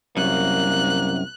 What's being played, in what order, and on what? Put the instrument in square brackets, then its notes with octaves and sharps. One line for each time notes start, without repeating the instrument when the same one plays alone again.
[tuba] C2 [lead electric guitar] F#2 [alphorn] A#3 [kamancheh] F#6